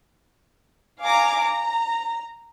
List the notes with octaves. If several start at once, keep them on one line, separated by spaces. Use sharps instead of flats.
F5 G#5 A#5 D6
A#5